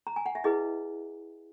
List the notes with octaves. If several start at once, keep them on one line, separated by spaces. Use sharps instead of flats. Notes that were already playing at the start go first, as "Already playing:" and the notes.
A#5
G#5
F#5
E5
E4 G#4 B4 D#5